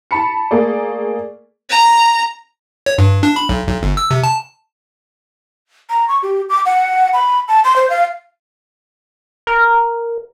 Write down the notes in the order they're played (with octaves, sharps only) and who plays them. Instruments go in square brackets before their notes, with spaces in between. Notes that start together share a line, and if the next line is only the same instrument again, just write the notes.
[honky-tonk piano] A5 B5 C#7
A3 A#3 G#4 D5
[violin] A#5
[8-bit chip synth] C#5
G2
D4
B5
B1
B1
G1
E6
C3
A5
[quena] A#5
C#6
G4
D6
F#5
B5
A5
C6
C5
F5
[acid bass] A#4